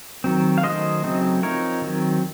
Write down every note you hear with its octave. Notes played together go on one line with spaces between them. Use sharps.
D#3 F#3 C4
F5
D#3 F#3 A3 C#4 C5 D#5
C#3 F#3 A3 C4 D#4
F3 C4 D#4 A#4 C#5
D#3 F#3 C4